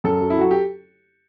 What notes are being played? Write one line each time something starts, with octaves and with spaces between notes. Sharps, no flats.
F#2 A4
F#3
E4
F#3 F#4
G4